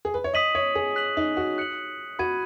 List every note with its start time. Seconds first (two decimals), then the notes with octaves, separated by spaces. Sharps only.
0.05 G#4
0.14 B4
0.24 C#5
0.33 D#5 D#6 B6 D#7 F#7
0.55 C#5
0.75 G#4
0.96 F#6 B6 F#7
1.17 D#4
1.37 F#4
1.58 F#6 C#7 F#7
2.19 F#4 B5 G#6 D#7